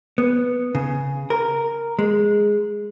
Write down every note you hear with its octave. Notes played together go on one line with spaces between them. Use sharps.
B3
C#3
A#4
G#3